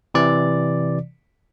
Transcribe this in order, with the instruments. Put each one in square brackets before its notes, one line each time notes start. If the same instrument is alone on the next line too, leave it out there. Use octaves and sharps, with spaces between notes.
[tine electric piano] C3 E3 D5